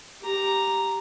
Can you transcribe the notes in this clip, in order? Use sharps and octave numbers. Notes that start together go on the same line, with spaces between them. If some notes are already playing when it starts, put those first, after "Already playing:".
G4 A#5